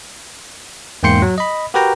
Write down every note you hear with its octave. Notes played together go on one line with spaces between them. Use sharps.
E2 G#2 A#3 G5 C6 C#7
F#3
D#5 B5
F#4 G4 A#4 B4 G5 A#5